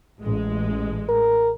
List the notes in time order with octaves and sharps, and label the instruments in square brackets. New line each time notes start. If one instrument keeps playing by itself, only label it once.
[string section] A1 G#3
[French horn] A#4